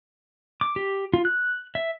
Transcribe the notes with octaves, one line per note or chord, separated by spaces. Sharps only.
D6
G4
F4
F#6
E5